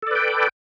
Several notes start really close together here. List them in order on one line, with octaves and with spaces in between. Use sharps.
A4 D5 B4 G5